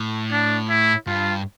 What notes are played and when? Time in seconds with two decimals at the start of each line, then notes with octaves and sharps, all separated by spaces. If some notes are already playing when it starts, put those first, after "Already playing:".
Already playing: A2
0.31 D4
0.69 E4
1.07 G2 F4